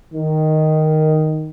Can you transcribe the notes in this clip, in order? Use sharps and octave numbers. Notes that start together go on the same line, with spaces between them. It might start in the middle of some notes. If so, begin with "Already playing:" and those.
D#3